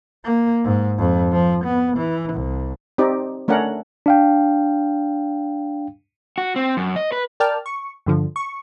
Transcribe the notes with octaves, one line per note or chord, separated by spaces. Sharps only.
A#3
G#2
F2
F3
B3
E3
C2
C4 D#4 G4 D5
A3 C#4 D4 A#4 F#5
D4 F5 G5
F#4
C4
F#2
D#5
B4
A#4 D5 G5 A5 F6
C#6
G2 D3 F3
C#6